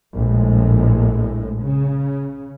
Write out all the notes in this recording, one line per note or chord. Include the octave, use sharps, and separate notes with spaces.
A#1 A2 G#3
C#3